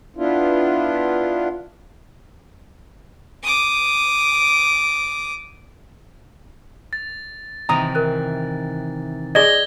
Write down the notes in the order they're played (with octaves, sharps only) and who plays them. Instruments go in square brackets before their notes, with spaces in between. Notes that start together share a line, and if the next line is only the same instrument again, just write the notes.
[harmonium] B3 D4 E4 F4
[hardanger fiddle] D6 D#6
[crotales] A6
[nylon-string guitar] C3 D#3 E3 [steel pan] A#5 D#6
[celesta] A#4 F#6
[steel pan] G#4 D5 D#5 [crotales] G#6 A#6 G7